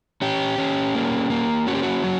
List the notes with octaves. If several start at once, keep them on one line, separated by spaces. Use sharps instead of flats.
C#4 G4
C#4
A#3
A#3
C#4 F#4
G4
F#4
F#3